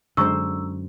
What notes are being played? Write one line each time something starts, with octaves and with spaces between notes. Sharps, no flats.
F#2 D3 G#3 C5 A#5 C#6 E6